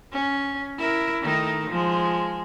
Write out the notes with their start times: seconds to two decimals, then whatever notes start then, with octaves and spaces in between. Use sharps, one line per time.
0.12 C#4
0.78 E4 A#4
1.22 D#3 A3 D#4
1.70 F3 G#3